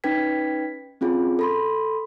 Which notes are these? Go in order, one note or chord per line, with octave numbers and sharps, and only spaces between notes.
C#4 D#4 B4 G5 G#6 B6
C4 C#4 F4 G#4
A4 B5 C6